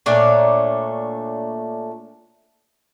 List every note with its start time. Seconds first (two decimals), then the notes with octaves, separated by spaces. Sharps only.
0.06 A#2 A3 D4 C#5